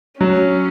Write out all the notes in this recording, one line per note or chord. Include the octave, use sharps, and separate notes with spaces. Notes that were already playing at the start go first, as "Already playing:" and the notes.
F#3 C#4